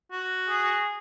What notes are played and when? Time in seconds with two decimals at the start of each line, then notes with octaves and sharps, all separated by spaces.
0.12 F#4
0.48 G#4